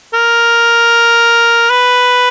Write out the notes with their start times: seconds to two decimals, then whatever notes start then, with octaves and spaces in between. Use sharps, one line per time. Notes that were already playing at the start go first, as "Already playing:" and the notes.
0.13 A#4
1.70 B4